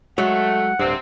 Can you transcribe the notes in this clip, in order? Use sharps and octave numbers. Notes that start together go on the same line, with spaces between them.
F#3 G#3 A3 F#5
D1 G2 C3 C4